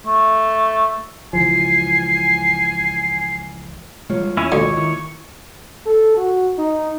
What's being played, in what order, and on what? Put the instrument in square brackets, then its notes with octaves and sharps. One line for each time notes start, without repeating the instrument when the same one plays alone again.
[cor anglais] A3
[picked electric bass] C#2 E3 F3 [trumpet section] G#5 [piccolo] C7
[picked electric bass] E3 G3 G#3 [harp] F4 C#5
[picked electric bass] E2 [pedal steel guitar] C#4 E4
[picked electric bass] A1 D#3 G#3 [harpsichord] D2 [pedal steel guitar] C#5 [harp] D#5 D6
[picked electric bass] D#3 [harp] E4
[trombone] A4
F#4
D#4